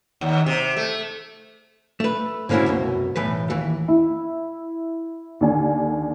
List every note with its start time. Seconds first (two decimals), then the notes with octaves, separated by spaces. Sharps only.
0.21 D#2
0.46 C3
0.76 A3
2.00 A3 B4
2.49 G#2 D3 A#3 C#4 E4 F#4
2.66 C2 F#2 B2
3.16 B1 A2 E3 B4
3.50 D#2 E3
3.88 E4
5.41 D#2 D3 D5 G#5